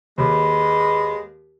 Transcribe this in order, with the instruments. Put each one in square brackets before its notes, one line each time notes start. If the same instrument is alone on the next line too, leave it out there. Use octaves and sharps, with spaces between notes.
[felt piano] D#2 [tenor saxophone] G#3 [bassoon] B4